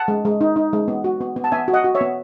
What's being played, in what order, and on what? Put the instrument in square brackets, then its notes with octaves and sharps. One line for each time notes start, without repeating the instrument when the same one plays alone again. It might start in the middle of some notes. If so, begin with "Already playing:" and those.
Already playing: [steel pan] F#5 A5
G#3
G#3
D#4
D#4
G#3
B3
F#4
B3
B3
A5
B3 E5 G#5
F#4
D#5 F#5
F#4
C#5 E5
B3